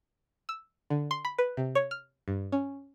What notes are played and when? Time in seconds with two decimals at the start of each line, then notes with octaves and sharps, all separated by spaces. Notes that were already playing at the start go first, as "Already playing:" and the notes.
0.49 E6
0.90 D3
1.11 C6
1.25 B5
1.39 B4
1.57 C3
1.75 C#5
1.91 F6
2.28 G2
2.52 C#4